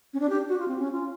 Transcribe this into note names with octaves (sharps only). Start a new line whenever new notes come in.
C#4
D4
G4
F#4
F4
C4
C#4
F4